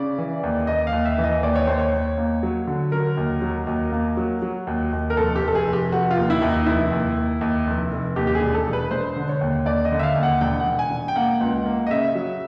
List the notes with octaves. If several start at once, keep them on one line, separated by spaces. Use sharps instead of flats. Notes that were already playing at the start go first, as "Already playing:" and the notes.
Already playing: C#3 D5
E3
D#2
D#2 D#5
F5
D#2
E5
E3
D#5
D#2 D5
C#5
D#2 C5
C#5
D#2
A#3
F#3
D3
F#3 A#4
D#2
F#3
D#2
A#3
F#3
F#3
D#2
D#2
A#4
F1 A4
G4
F1
A4
G#4
F1
G4
F1 F#4
F4
D#2
E4
D#2
D#4
F1 E4
D#2
D#2
D#2
F1
F1
D#2 G4
G4
G#4
E1
A4
E1
B4
E1 C5
D3
C#5
D#2
D#2 D5
D#5
D3
E5
F5
D#2
F#5
E1 G5
F#5
E1
G#5
E1
G5
A#3 F#5
C#2
A#3
D#5
C#3 E5
F#3